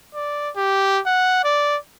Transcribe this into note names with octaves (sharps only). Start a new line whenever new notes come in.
D5
G4
F#5
D5